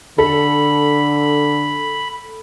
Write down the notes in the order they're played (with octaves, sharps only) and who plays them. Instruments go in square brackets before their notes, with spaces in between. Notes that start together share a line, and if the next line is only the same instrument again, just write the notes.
[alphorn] D3 [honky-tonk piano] A4 [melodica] B5